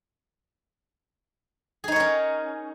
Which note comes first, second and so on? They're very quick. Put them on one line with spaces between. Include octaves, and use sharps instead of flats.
G#4 D#4 C#5 A#4 C#4